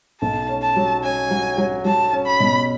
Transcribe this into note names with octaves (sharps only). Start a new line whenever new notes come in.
B1 A5
C#4
A5
F#3
C#4 G#5
F#3
F#3
F#3 A5
C#4
B5
B2